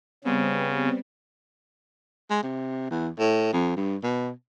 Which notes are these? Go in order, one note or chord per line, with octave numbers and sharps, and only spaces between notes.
C#3 G3 B3 C4
G#3
C3
E2
A2
F2
G2
B2